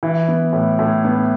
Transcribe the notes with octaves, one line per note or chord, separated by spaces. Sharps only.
E3
B3
A2
A2
B3